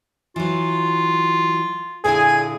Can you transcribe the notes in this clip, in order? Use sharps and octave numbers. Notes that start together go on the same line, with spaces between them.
E3 F#3 F4
A#2 D3 E4 G#4 G#5